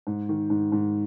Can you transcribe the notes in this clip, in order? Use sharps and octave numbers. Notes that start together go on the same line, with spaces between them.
G#2
D#3
G#2
G#2